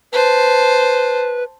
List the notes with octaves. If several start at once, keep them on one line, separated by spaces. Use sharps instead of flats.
B4 C5 A5